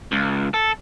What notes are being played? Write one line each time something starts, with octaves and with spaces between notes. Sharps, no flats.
C#2
A4